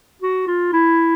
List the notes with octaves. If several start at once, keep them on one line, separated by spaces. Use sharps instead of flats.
F#4
F4
E4